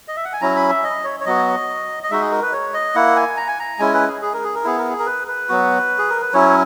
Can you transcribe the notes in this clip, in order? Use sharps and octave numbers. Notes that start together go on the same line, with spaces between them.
D#5
E5
F#5
G#5
F#3 C#4 E4 A#5
B5
E5
D#5
C#5
C#5
F#3 B3 F#4 D#5
D#5
G#3 D#4 F#4 E5
G#4
A#4
B4
C#5
D#5
A#3 E4 F#5
G#5
A#5
G#5
A#5
G#3 C#4 E4 G#5
B4
G#4
G#4
A#4
G#4
A#4
B3 E4 G#4
A#4
G#4
A#4
B4
B4
F#3 B3 F#4
G#4
A#4
B4
F#3 C#4 E4 C#5